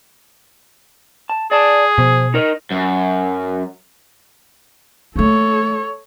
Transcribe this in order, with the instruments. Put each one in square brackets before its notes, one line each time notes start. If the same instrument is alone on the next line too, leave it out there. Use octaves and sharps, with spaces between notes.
[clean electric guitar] A5
[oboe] G#4 [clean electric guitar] D5 A5
[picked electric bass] B2 [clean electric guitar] F3
[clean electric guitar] D#4 A#4 D#5
[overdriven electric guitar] F#2
[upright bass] A3 A#3 [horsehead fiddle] A4 C#5